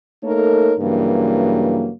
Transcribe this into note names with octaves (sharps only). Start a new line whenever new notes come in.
A3 A#3 D#4 A4 A#4 C#5
G2 C#3 E3 F#3 A#3